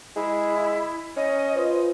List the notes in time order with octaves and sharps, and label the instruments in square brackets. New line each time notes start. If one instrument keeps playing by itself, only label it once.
[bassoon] G#3 [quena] E4
[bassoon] C#4 [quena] D#5
[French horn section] F4 B4 C5